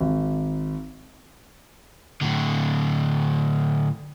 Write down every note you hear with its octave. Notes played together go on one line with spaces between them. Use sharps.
G#1
A2 D3